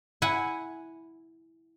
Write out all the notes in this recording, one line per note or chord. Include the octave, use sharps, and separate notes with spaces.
E4 F#5 G#5